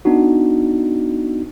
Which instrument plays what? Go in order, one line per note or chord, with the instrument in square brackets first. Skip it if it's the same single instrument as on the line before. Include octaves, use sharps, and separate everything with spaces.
[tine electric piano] B3 D4 D#4 F#4